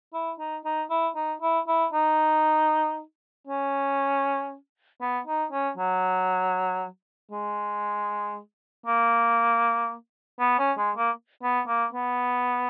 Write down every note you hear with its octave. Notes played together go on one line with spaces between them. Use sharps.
E4
D#4
D#4
E4
D#4
E4
E4
D#4
C#4
B3
D#4
C#4
F#3
G#3
A#3
B3
C#4
G#3
A#3
B3
A#3
B3